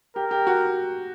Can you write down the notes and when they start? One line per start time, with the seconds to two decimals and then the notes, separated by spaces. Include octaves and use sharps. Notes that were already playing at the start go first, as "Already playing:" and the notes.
0.16 G4 A#4
0.31 G4
0.47 F#4